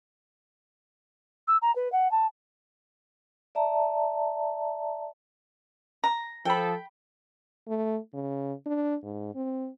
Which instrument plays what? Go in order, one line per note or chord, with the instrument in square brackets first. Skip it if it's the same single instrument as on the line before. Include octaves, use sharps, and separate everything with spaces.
[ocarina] E6
A#5
B4
F#5
A5
[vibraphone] D5 E5 A5 A#5
[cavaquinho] A#5
[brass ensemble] F3 A4 [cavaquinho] G5 B5
[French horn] A3
C#3
D4
G#2
C4